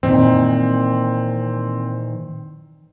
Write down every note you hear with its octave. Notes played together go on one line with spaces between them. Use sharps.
A#2 D#3 E3 C4